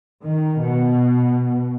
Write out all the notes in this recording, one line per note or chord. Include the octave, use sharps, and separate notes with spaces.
D#3
B2